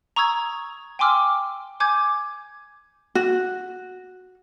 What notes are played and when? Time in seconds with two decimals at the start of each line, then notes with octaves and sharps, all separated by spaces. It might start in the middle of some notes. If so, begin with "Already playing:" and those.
0.16 A#5 C#6 D#6 E6 G#6
0.99 G5 G#5 C6 D6 E6 F6
1.80 G#5 D6 G6 G#6
3.15 F#4